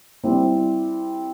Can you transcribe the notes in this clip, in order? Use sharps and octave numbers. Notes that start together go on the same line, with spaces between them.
G3 C4 E4